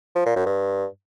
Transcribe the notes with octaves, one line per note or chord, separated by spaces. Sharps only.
F3
A#2
F#2
G2